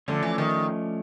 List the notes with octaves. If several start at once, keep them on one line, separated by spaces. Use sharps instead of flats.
D3 F3 A3 C#4
E3
D#3